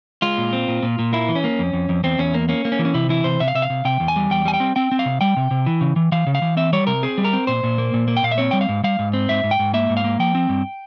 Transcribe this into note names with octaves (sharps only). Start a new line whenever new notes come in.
G#3 F4
A#2
C4
A#2
A#2
A#2
A#3 E4
E3
C#4
A#3
F2
F2
F2
E2 C4
E2 C#4
A#3
A#3 C#4
A#3
C#4
E3
C#4
C3 E4
E3 E4
C3 C5
C3 E5
F5
C3 E5
F5
C3
C3 G5
E2
G#5
G3
E2 G5
G3 G#5
G5
C4
C4 G5
C4
F5
C3
G3 G5
C3
C3
E3
C#3
E3
E3 F5
C#3
F5
E3
C4 E5
G3 C#5
C3 A#4
C4 G#4
G3
A#4
C4
A#2 C5
A#2
A#3
A#2
A#3
G5
A#2 F5
E5
C4 C#5
G3 G5
F5
G#2
G3 F5
G#2
C4
G#2 E5
G#2
G5
G#2
A#3 E5
G#2
F5
A#3
F3 G5
C4
G2